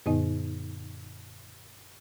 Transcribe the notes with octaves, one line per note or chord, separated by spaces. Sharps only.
F#2 A#2 D3 B3 D#4 D#5